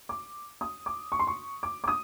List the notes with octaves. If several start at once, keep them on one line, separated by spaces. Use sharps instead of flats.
D6
D#6
D6
C#6
C6
C#6
D6
D6
D#6